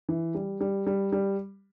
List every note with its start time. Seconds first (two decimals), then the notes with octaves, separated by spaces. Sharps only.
0.09 E3
0.35 G3
0.61 G3
0.87 G3
1.12 G3